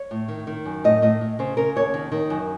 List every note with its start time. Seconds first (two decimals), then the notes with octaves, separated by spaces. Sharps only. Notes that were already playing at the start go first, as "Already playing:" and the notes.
Already playing: C#5
0.11 A2
0.28 D#3
0.47 D#3
0.65 F#2
0.84 A2 D#5
1.02 A2 D#5
1.21 A2
1.39 C#3 C5
1.57 C#3 A#4
1.76 D#2 C#5
1.94 D#3
2.12 D#3
2.30 F#2